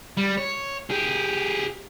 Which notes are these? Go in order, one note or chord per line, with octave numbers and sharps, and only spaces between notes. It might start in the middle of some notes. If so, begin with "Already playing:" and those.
G3
C#5
G4 G#4